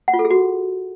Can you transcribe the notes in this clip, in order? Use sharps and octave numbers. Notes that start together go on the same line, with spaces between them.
F#5
F4
A4
G#4
F#4